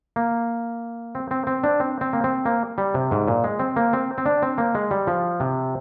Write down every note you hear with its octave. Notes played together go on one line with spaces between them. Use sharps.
A#3
C4
C4
C4
D4
C4
C4
A#3
C4
A#3
G3
C3
G#2
A#2
G#3
C4
A#3
C4
C4
D4
C4
A#3
G#3
G3
F3
C3